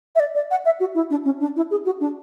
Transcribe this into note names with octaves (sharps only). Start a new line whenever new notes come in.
E5
D5
D5
F#5
E5
F#4
E4
D4
C#4
D4
E4
G#4
F#4
D4